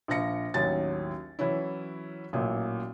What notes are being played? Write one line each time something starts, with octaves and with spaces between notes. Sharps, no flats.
A#1 F3 F5 A#6 C#7
A1 D#2 F#3 C#4 G#5 A6
E3 F#3 C#4 E4
A1 A#2 F#3